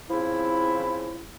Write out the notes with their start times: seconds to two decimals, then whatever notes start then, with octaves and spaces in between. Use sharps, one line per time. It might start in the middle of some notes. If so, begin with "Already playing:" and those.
0.11 C#3 F3 C4 E4